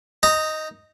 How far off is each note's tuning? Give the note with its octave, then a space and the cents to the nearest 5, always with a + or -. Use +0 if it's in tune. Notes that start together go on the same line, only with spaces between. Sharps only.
D#4 +0 A#5 -20